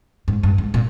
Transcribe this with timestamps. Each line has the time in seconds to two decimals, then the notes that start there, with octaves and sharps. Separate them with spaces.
0.28 G#2
0.43 G2
0.58 G#2
0.74 A#2